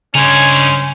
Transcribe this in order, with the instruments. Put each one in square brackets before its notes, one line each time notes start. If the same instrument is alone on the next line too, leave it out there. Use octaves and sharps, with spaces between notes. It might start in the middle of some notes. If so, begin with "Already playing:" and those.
[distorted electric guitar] G2 D#4 [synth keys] C#3 [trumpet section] C#4 C5 [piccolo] G#5